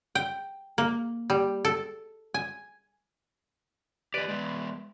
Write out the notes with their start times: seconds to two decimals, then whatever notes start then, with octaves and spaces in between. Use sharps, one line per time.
0.15 G5
0.78 A#3
1.30 G3
1.65 A4
2.34 G#5
4.14 G4 B4 D5 D#5
4.28 G#3 B3